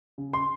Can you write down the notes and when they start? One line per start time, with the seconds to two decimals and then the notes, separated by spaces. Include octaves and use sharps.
0.18 C#3
0.33 C6